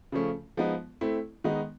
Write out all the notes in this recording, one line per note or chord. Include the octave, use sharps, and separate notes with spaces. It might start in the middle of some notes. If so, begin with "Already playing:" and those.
C#3 F3 A3 C#4
F3 G#3 B3 D#4
A3 C4 E4
D#3 G#3 B3 D#4